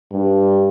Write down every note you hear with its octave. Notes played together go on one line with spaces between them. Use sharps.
G2